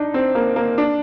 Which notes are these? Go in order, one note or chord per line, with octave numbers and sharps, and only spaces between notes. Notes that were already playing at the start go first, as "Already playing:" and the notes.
Already playing: D4 D#4
C4
A#3
A#3
D4